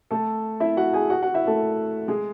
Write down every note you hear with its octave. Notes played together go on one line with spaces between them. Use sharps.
A3 A4
E4 E5
F#4 F#5
G#4 G#5
F#4 F#5
F#4 F#5
E4 E5
A3 A4
G#3 G#4